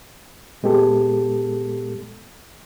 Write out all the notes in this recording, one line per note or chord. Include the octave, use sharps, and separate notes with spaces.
A#2 G#3 B3 G4 A4